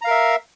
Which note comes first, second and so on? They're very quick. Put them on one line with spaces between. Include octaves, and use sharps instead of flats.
A#5 F5 A#4 E5